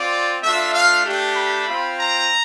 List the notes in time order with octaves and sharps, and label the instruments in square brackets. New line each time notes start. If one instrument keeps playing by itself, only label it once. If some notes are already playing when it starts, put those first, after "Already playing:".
Already playing: [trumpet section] C4 F4 D5
A3 D4 F4 E5
F5
A3 D4 G4
B5
C4 F4
A#5